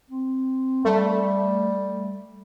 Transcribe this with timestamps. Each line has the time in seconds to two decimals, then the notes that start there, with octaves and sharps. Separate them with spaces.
0.10 C4
0.85 G3 A3